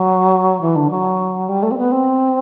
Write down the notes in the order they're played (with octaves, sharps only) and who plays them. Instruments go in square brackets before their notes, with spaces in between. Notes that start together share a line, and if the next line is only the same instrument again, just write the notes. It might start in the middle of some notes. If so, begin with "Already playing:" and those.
Already playing: [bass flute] F#3
E3
D3
F#3
G3
A3
C4
B3
C4